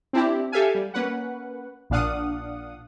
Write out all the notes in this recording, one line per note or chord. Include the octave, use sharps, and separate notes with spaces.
C4 D4 E4 G4
G4 A4 E5 F5 G#5
G3
A#3 C#4 B4 F#5
A#1 A#2 D4 F5 F#5 D#6